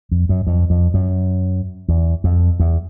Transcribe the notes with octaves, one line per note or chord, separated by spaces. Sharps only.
F2
F#2
F2
F2
F#2
E2
F2
E2